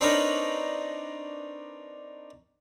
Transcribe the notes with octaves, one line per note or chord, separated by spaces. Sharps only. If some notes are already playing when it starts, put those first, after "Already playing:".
C4 D4 D#4 A#4 B4 C#5